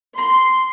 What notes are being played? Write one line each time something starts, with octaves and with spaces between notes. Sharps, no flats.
C6